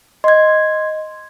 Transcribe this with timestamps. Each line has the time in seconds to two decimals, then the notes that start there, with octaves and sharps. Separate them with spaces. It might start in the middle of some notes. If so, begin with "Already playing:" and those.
0.24 D#5 C6 G#6